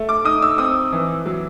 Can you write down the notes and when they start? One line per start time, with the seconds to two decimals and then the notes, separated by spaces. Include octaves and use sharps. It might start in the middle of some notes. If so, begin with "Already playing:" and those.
Already playing: A3
0.09 D6
0.25 D#4 D#6
0.42 E6
0.58 C4 D#6
0.93 E3
1.26 F#3